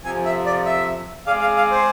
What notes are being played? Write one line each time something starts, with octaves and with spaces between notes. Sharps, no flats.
F2 C3 F3 G#5
E5
D5
E5
G#3 C4 G#4 D5 F5
F5
F5
C5